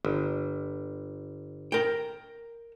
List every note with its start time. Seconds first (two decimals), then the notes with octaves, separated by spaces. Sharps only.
0.05 G1
1.72 A#4 G5